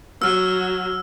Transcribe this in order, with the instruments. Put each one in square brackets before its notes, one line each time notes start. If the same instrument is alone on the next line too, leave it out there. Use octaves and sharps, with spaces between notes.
[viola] F#3 [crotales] E6 F6